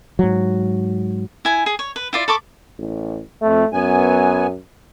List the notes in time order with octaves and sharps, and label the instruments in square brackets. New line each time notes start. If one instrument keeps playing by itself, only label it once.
[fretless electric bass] G#2 F#3
[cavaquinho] E4 G#5
G#4
C#5
B4
E4 F4 D5
A4 B5 C#6 D6
[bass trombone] A1
[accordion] F2 [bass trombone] A3
[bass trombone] F#2 [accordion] B3 G#5